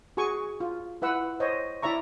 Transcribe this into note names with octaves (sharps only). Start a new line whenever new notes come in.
F#4 G#4 G#5 C#6
F4
E4 B4 F#5 E6
C5 C#5 D#5
E4 D5 E5 A#5 C#6